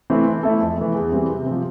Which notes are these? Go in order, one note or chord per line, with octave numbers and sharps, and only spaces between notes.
E3 A3 C4 E4
E3
A3 E4 A4
F2
E3 A3
E2
E3 G3 C4
C3
F3 C4